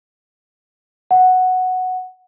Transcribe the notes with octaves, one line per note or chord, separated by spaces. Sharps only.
F#5